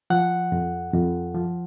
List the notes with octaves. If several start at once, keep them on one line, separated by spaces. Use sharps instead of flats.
F3 F#5
F2
F2
F3